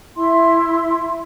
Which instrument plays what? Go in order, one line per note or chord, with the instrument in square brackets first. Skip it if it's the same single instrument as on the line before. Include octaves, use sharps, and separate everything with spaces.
[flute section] E4 E5 C6